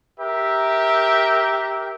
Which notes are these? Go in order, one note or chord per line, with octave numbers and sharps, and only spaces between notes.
G4 A#4 E5